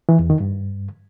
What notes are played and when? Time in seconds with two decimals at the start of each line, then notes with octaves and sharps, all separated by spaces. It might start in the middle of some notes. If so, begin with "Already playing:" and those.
0.09 E3
0.19 E2
0.30 D#3
0.40 G2